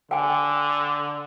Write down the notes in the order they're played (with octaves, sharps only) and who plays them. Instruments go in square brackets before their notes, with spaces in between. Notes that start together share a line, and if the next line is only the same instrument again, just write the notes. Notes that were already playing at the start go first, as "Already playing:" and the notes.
[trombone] D3 [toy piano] G5 G#5